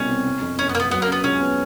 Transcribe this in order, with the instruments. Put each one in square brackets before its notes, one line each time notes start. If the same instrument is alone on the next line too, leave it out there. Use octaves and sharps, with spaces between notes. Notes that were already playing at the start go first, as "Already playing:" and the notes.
Already playing: [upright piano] C2 B2 G3 [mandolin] C#4
[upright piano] C4
C3
F2
[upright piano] F#1 [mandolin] C#4
[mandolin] B3
[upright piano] F#1 [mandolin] A#3
[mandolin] B3
[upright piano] F#3 [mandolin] B3
[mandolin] A#3
[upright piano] C#3 [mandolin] B3
[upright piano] C#2 [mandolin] C#4
[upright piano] B3